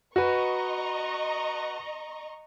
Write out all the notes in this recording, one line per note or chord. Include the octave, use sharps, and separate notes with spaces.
F#4 B4 D#5 A#5 C#6